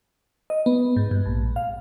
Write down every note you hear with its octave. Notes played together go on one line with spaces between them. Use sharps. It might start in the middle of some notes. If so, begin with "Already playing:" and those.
D#5
B3
G#2
G2
A#1
F5